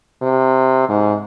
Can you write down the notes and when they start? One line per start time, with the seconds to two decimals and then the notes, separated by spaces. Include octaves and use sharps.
0.22 C3
0.89 G#2